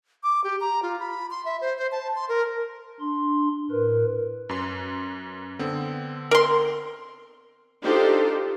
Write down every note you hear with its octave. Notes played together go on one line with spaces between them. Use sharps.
D6
G4
A#5
F4
B5
C6
E5
C5
C5
A5
C6
A#4
D4 C6
A2 A#4 B4
F#2 B4 C6
D3 B3 C4
A#4 C6
D4 D#4 F4 G4 A4 C5